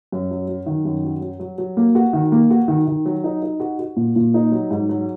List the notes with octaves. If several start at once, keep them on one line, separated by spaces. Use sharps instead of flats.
F#2
F#3
F#3
D#3
F#2
F#3
F#3
F#3
F#3
A#3
F#4
D#3
A#3
F#4
D#3
D#3
F#3
D#4
D#4
F#4
F#4
A#2
A#2
D#4
F#3
G#2
F#3